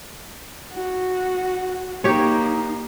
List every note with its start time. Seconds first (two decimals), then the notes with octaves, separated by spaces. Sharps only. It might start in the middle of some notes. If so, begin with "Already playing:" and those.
0.73 F#4
2.04 A#3 D#4 G4 C#5